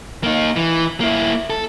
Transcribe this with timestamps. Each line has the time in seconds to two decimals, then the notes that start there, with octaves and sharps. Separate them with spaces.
0.24 A#3 D#4
0.56 E3
1.01 A#3 E4
1.50 A4